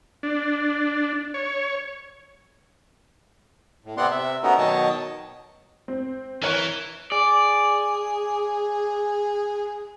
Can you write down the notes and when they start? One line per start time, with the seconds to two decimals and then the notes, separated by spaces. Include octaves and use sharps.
0.23 D4
1.34 C#5
3.85 A2
3.97 C3 B3 C4 D5 F#5 C6
4.11 C3 E5
4.43 A3 B3 C#4 D#4 F#4 A#4
4.58 B2 D#3 F#3 C#5 D#5 A5
5.88 C4
6.42 E3 A#4 C#5
7.12 G#4 D5